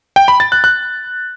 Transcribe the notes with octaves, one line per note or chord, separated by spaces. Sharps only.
G5
B5
A6
F#6
F#6